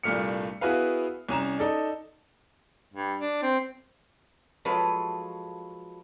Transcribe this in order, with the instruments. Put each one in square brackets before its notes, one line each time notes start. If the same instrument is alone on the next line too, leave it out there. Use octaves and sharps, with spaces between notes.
[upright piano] C2 G2 A#2 A3 F6 C#7
B3 E4 F#4 G#4 B4 F5
C2 C#4 A#5 E7
D#4 A4 D5
[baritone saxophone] G2
D4
C4
[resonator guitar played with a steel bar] F3 F#3 G#3 A4 B4